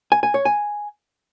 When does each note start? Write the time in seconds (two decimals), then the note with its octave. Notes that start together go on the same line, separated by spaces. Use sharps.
0.12 G#5
0.23 G#5
0.34 C#5
0.45 G#5